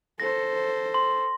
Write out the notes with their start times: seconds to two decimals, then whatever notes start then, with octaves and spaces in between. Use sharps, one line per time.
0.20 A4 C5 A#6
0.94 C6